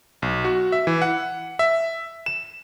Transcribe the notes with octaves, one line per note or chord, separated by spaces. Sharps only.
B1
F#4
E5
E3
F#5
E5
E7